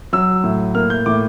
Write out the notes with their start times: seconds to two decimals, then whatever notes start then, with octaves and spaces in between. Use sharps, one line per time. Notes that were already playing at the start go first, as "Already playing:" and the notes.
0.13 F#3 E6
0.44 A2
0.75 A#3 F6
0.90 G6
1.06 A2 D6